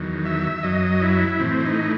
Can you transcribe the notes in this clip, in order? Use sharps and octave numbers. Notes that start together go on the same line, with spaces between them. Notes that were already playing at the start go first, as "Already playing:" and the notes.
Already playing: E2 D#3 F#3
E5
F#2 F#3 D#5
E4
A2 E3 C4
D#4